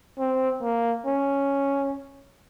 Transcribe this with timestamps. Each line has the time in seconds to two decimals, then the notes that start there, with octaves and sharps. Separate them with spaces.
0.19 C4
0.62 A#3
1.06 C#4